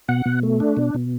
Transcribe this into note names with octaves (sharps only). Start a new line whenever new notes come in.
B2 F#5
B2
A3
D4
B2
B2